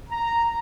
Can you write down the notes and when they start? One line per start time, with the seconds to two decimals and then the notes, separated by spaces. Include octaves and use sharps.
0.10 A#5